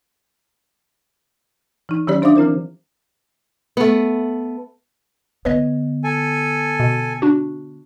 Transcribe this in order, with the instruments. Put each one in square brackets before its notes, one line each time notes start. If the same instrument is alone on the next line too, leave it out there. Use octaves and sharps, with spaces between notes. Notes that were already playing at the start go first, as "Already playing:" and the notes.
[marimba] E3 D#4
D#3 F#3 C#4 G4 C#5 D5
D4 C5 E5 F5 D6 D#6
E3 C4 E4 A#4 C5
[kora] A3 B3
[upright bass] D3 B3 [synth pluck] B4 C#5 D#5
[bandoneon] A4 G#5
[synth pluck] B2
D4 F#4